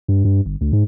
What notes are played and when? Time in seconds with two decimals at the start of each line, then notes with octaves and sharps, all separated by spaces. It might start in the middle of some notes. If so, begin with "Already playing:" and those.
0.08 G2
0.25 G2
0.46 G1
0.61 D2
0.73 G#2